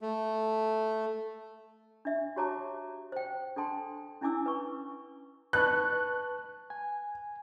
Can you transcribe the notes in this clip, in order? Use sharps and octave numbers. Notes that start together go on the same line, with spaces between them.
A3
D4 E5
F#4 G4 C#5 A5 A#5 D6
C5 G5
D4 A4 G5 A5 C6
C#4 D4 E4 G#5 D6 E6
B4 C#6
B4 A5 C#6 F#6
G#5